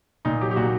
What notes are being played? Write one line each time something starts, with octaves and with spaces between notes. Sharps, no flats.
A#2 D#4
F#3 G4
G4
A#2 F#4